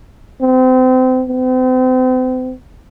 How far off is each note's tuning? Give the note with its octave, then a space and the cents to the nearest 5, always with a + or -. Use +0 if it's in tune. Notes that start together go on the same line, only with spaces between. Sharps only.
C4 -30
C4 -40